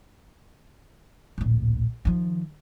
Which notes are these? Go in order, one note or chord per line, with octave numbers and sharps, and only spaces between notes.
D1 A#1
D#3 F3